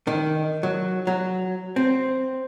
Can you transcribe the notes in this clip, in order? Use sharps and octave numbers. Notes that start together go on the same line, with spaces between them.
D#3
F#3
F#3
C4